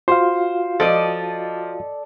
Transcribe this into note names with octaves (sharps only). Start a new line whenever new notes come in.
F4 F#4 C5 F5
F3 A4 D5 D#5